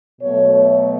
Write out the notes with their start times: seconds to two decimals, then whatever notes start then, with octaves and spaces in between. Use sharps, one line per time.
0.20 B2 F#3 A3 C#5
0.49 C#5